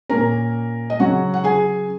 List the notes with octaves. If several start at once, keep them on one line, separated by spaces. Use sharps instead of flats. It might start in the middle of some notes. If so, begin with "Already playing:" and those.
A#2 A#3 C#4 A#4 A#5
D#5
C#3 F#3 C#4 F#4 F#5
F#5
G#4 G#5